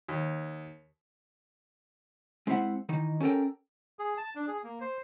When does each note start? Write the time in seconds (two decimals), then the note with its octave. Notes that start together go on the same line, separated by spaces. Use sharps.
0.09 D#2
2.47 G#3 C4 E4 C5 E5 F#5
2.89 D#3 E3 D#4
3.20 C#4 G4 A4 A#4 G5
3.99 G#4
4.17 A5
4.35 D4
4.47 G#4
4.64 A#3
4.81 C5